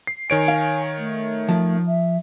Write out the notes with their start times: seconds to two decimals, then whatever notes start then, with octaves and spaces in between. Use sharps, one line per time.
0.07 C7
0.30 D#3 C#5 G#5 D7
0.48 F5
0.98 A3
1.49 F3
1.87 E5